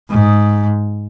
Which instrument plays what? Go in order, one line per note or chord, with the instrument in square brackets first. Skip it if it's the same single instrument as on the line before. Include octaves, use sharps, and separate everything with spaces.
[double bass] G#2